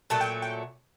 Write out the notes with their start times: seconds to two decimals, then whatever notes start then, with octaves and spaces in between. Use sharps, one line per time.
0.10 A#2 F#3 A3 A5
0.21 G5
0.42 G5